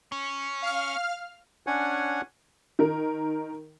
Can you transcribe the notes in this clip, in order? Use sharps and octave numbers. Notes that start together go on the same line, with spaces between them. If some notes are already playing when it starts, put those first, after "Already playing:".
C#4
F5 F6
C#4 D4 C#5 F#5 G#5
D#3 A#4